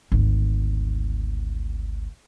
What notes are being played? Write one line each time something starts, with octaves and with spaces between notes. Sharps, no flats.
G#1 D2